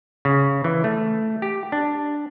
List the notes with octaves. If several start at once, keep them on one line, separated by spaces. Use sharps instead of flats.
C#3
E3
A3
G4
D4